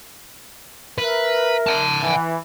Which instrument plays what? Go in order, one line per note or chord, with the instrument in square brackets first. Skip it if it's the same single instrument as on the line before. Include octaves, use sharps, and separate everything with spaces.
[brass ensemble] A#4 E5 [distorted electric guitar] B4
[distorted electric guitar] F#5 A5
[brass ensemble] E3